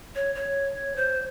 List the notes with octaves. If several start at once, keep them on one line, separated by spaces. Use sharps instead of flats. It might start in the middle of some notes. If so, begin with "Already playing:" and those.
C#5
C#5
C5